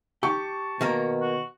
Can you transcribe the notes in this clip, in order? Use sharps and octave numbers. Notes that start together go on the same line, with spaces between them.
G4 A5 C#6
B2 D#3 A#3 A#4
F#4